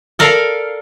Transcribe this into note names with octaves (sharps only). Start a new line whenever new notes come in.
A4 A#4 D5 F5